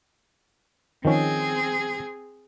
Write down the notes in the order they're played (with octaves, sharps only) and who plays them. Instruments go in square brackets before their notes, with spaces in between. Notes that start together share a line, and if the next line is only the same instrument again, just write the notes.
[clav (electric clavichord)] D#3 F3 C#4 [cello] C4 G#4